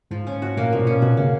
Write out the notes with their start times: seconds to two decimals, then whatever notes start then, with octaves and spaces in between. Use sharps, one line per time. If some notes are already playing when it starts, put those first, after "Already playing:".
0.11 G#2 F3
0.27 C#4
0.42 F#4
0.57 A#2 A#3
0.73 B2 F3
0.79 A#2
0.87 C#4
1.02 B2 F#4
1.17 C#3 A#3